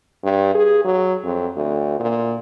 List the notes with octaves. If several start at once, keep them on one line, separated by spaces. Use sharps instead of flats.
G2
G#4
F#3
F2
D2
A#2